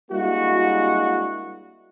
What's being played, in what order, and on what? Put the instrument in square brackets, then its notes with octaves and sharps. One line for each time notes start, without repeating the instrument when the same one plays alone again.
[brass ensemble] G3 G#3 A#3 D4 E4 F#4